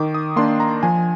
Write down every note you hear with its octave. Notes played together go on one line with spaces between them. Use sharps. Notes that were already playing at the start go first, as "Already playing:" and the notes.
Already playing: D#3 D6
D#6
A#3 D4 C6
A#5
F3 G#5